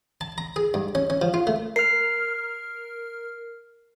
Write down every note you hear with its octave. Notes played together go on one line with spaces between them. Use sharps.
A5
A#5
G#4
G2
C#4
C#4
F3
F4
A3
A#4 F6 C7